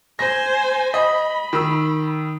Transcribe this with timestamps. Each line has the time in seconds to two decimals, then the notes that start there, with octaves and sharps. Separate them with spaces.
0.19 C5 G#5 A#6
0.94 D#5 B5
1.53 D#3 E6